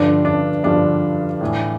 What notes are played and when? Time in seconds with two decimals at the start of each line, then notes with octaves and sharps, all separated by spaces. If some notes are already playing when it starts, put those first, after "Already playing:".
Already playing: G2 D3 F3 D4
0.25 D4
0.64 G2 D3 F3 D4
1.41 A2 E3